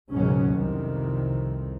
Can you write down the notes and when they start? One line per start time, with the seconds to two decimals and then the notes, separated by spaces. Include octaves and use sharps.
0.10 C#2 G#2 B2 D#3 F#3 C#4
0.52 C2 F2 C3 D#3